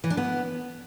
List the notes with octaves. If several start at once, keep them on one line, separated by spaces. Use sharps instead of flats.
E3
D4
B3